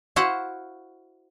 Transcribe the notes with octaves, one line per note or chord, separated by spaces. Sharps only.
E4 F#4 C5 F5 F#5